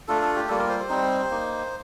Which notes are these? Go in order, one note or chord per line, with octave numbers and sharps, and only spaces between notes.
A3 D4 F4 A4
A4
G4
G3 A#3 F4 A4
A#4
C5
C5
G3 C4 D#4
A#3 D#4